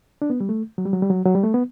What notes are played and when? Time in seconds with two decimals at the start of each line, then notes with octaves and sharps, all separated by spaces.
0.22 D4
0.30 B3
0.40 G3
0.49 A3
0.78 F#3
0.86 G3
0.93 F#3
1.02 G3
1.10 F#3
1.26 F#3
1.35 G3
1.44 A3
1.54 B3